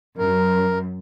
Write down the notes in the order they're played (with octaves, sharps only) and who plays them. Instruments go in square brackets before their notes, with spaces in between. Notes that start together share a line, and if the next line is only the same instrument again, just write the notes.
[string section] F#2 [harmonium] A#4